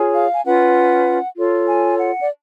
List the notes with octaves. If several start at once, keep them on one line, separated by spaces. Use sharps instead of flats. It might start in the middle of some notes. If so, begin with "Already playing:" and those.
Already playing: F4 G#4 C#5
F5
G#5
C#4 F4 B4 F#5
F4 A4 C#5
G#5
F#5
D5